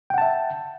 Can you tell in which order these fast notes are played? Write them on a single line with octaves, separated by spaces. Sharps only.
G5 F#5 A5 E5